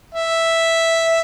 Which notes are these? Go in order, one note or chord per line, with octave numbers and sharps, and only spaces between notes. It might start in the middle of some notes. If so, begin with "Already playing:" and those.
E5